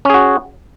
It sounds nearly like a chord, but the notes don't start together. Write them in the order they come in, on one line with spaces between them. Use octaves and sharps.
C#4 G#4 F#4